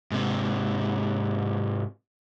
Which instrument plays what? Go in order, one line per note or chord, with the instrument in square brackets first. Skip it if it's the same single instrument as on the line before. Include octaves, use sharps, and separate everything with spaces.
[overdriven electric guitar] G#2 C3